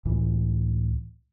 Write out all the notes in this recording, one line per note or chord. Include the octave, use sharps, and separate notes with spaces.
C#2 A2 E3